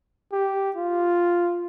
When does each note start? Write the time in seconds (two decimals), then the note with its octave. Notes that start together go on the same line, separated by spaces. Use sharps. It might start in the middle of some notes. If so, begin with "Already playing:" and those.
0.32 G4
0.76 F4